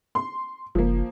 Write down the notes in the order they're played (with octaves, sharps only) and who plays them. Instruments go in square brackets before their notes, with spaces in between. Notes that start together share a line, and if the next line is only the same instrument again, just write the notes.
[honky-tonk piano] C6
[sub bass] F#1 [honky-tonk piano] F3 A#3